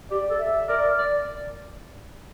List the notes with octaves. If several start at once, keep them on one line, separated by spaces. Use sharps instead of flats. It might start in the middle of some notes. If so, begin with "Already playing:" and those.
G4 D5
A4
E5
A#4 D5
D5